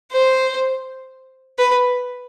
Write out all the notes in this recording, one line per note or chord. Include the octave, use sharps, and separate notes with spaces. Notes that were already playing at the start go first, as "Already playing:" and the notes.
C5
B4